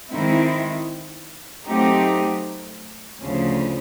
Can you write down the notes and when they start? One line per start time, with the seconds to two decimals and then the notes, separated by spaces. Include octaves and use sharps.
0.10 D#3 G#3 C4 E4
1.65 F#3 A3 C4 D#4 G4
3.21 D2 C#3 F3